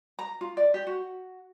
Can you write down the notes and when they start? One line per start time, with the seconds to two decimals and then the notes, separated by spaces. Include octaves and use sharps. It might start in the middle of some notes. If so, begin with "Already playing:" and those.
0.19 A#5
0.41 F4
0.57 D5
0.74 G4
0.87 F#4